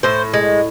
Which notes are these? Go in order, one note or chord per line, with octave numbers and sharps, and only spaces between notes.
A2 C5
G#3